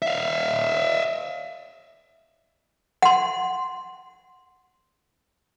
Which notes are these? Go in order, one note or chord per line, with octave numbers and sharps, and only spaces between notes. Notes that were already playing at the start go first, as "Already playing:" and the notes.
E5 F5
F#5 C6